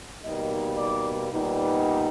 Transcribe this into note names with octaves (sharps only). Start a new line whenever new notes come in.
B2 G3 A#3 D#4 D#5
D5
A#2 G3 B3 D#4